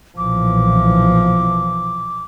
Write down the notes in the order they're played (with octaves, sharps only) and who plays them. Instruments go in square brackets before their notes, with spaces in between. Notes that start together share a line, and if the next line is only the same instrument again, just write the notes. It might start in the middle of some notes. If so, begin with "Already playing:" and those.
[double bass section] B1 A#2 E3 [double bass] F3 [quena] D6